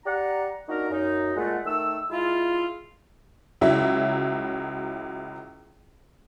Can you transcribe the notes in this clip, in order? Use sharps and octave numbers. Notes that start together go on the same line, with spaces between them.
G4 D5 F#5 A#5
A#3 D4 D#4 F#4 A#4
F#2 D#4
A#2 G#3 A3 F#5
D#3 A3 E6
G#3 E4 F4
C#2 F#3 E4 E5